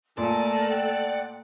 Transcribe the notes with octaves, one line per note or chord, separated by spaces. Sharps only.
A#2 A3 A4 A#4 D5 G#5 A5
F#5 G5